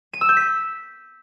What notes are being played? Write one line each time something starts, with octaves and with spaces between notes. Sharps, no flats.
D#7
E6
G6
B6